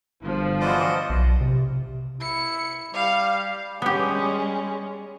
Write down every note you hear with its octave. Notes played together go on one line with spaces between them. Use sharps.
G1 F3
E3 F4 F#4 C5 D5 D#5
B1
C3
E4 C#7
G3 F5
G3 G#3 B3 C#4 G4